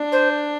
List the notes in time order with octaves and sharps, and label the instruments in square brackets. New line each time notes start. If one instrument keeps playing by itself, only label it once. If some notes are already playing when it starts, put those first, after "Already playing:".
Already playing: [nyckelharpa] D4
[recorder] C5